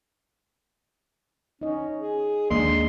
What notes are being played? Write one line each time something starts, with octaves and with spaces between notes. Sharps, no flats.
C#4 D#4 D#5
G#4
D#2 G#3 A#3 D4 D#5 C6